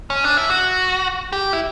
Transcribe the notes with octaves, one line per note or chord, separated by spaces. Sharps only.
C#4
D4
E4
F#4
G4
E4